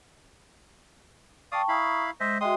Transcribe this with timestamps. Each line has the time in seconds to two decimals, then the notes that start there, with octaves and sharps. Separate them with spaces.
1.52 D5 F5 G5 A5 C#6 D#6
1.68 E4 F5 A#5 B5 C#6 D#6
2.20 G#3 C5 D#5 E5
2.41 G#3 F#4 E5 G5 C6 D#6